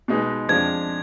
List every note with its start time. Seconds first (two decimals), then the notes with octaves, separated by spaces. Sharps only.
0.08 B2 G#3 D#4 G#4 B4
0.49 F2 F3 G#3 D4 G#6